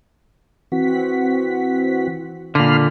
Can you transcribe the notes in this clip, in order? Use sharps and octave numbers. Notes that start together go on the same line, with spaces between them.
E3 C4 F#4 F#5 B6
A#2 D3 F5 B5 F6